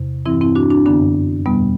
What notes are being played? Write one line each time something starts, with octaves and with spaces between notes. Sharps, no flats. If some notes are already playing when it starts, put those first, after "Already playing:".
Already playing: E2 C3
G2 E3 C4 E4
C4 E4
D4 F#4
D4 F#4
F#2 D3 B3 D4
E2 B2 G3 B3